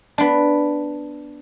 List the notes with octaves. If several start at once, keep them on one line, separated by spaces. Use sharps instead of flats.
B3 D4